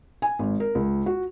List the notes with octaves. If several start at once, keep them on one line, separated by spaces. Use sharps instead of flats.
G#5
G#1
A#4
C#2
F#4